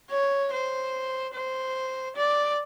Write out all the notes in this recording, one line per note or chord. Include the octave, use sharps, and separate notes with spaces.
C#5
C5
C5
D5